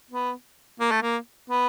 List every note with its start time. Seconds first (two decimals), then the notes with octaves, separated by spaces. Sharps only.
0.11 B3
0.80 A#3
0.91 A3
1.03 A#3
1.50 B3